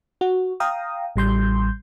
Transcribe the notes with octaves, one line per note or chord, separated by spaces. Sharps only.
F#4
F5 G5 A#5 D#6
A1 G3 C6 G6